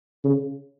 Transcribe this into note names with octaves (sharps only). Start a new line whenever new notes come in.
C#3